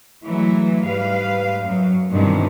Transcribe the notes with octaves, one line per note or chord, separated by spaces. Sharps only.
E3 F#3 G#3 A3 E4
G#2 G3 B4 F5
F#2 F#3
G2 B2 D#3 E3 C4